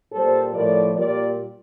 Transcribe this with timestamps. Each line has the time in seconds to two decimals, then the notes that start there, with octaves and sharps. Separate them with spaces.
0.12 A#2 G3 A4 C5
0.54 A2 F3 A#4 D5
0.94 A#2 G3 A#4 D5